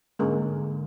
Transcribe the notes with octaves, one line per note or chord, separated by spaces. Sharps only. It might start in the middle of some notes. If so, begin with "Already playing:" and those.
G#2 D3 G#3 A#3 C#4